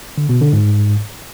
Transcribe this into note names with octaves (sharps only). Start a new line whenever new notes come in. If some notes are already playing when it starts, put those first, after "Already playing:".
D3
B2
D3
G#2